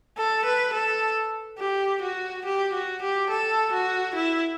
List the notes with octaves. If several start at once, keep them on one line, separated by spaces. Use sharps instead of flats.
A4
B4
A4
G4
F#4
G4
F#4
G4
A4
F#4
E4